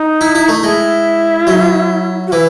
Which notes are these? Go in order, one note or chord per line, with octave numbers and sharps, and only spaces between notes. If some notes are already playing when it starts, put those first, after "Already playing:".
Already playing: D#4
E4
E4
A3
G#3 E4
F#3
F#4
E3 E4